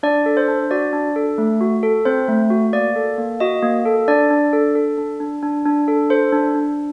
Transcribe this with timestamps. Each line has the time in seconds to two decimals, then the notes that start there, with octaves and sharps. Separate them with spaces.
0.03 D4 D5
0.26 A4
0.37 C5
0.48 D4
0.71 F#4 D5
0.93 D4
1.16 A4
1.38 A3
1.61 F#4
1.83 A4
2.05 C4 C5
2.28 A3
2.50 F#4
2.73 A#3 D5
2.96 A4
3.18 A#3
3.40 F#4 D#5
3.63 A#3
3.85 A4
4.08 D4 D5
4.30 D4
4.53 A4
4.75 A4
4.98 D4
5.20 D4
5.43 D4
5.66 D4
5.88 A4
6.10 A4 C5
6.33 D4
6.55 D4